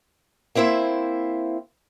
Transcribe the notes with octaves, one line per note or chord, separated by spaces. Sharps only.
A#3 C4 E4 C5 E5